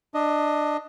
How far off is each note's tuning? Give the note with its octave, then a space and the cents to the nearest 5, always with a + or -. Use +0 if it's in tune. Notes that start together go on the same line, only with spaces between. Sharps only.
D4 +15 D#5 +5